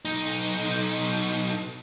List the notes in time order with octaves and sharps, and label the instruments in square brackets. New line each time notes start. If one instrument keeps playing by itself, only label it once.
[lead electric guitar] B1 D#4